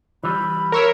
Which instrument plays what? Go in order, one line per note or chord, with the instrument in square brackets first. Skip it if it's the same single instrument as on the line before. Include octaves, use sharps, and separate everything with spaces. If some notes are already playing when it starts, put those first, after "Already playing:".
[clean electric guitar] E3 G3 [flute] B5
[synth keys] A#4 C#5 E5